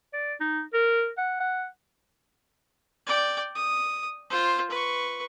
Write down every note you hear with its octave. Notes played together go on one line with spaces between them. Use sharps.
D5
D#4
A#4
F#5
F#5
D5 G5
D#6
F4 C5
B4 C#6